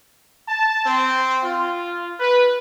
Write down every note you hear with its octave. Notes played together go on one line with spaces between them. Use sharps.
A5
C4
F4
B4